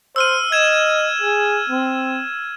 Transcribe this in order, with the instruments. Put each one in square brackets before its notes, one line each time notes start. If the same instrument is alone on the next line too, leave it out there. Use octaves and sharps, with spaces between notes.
[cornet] C5 [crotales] E6 F6 D#7
[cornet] D#5 [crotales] G#6 E7
[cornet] G#4
C4